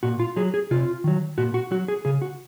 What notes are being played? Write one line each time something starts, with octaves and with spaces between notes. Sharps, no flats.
A#2 F#4
F4
F#3 G#4
G#4
C3 F4
D#3 F#3
A#2 F#4
F#4
F#3 F#4
G#4
C#3 G#4
F#4